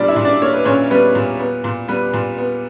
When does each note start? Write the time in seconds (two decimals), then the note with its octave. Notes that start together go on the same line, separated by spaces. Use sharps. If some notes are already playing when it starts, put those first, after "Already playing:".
Already playing: A#2 G3 A#3 B3 D4 D5
0.08 E4 E5
0.16 A#2
0.25 D4 D5
0.42 A#3 C#5
0.53 B4
0.65 A#2 C#4 C#5
0.90 G3 B3 B4
1.15 A#2
1.39 B3
1.64 A#2
1.88 G3 B3 B4
2.13 A#2
2.38 B3